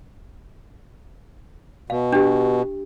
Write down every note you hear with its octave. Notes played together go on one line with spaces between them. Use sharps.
B2 F5
D4 G4